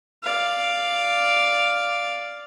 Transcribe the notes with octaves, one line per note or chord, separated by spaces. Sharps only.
D5 F5